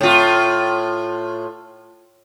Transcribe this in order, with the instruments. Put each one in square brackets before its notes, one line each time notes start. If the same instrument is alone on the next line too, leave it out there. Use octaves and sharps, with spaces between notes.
[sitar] A2 F4